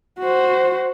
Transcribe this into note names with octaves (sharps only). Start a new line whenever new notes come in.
F#4 C5